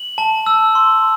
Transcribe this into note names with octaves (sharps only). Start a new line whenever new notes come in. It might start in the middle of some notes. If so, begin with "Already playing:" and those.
Already playing: F#7
A5
E6
C6